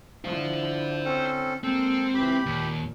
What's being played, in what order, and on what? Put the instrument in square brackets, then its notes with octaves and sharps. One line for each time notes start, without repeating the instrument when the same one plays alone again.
[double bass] D3 E4 [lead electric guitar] C5 F5
[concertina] C4 C#4 A4
[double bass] G#3 A#3 [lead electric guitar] C4 [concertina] A4
[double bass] C#2 E3 [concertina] G4 B5
[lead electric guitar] D#2 [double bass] A#2